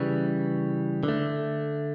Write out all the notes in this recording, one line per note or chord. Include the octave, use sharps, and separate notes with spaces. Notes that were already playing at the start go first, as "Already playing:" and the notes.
Already playing: C#3 E3 G3
D3 A3